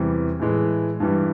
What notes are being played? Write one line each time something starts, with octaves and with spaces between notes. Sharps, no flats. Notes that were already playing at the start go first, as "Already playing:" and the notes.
Already playing: E2 C3 E3 G3
A2 E3 G#3
G2 E3 G3